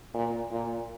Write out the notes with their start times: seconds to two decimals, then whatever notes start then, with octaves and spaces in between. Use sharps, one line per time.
0.14 A#2
0.51 A#2